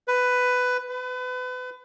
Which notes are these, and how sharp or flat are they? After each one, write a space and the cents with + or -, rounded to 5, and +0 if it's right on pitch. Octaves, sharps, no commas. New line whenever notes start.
B4 +10
B4 +30